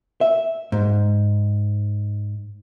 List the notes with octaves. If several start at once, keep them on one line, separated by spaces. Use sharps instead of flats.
E5
G#2